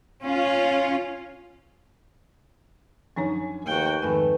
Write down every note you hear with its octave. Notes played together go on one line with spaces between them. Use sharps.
C#4 F4
F#2 F3 D4 D#4 C#5 G#5
D#2 A3 F#4 B4 G5
F2 G#2 D#3 A3 B4 G5 G#5 B5